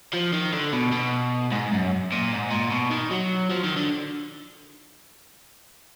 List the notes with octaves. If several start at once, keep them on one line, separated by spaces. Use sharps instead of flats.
F3
D#3
D3
B2
B2
G#2
F#2
A#2
G#2
A#2
B2
D#3
F#3
F3
D#3
D3